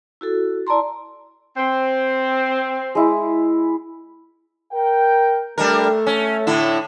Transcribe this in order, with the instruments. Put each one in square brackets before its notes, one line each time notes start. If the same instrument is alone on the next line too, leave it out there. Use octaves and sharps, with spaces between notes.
[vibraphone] E4 F#4 A4
E4 D5 A5 A#5 C6
[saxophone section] C4
[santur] G#3 E4
[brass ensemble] A#4 G5
[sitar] G3 D4 A#4 [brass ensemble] A3 A4
[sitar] C#4
A2 D3 E4